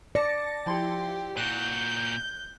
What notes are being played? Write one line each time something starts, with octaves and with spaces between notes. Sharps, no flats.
D5 A5 A#6 C#7
F3 E4 G4 C6
A#2 F#4 F#6 G6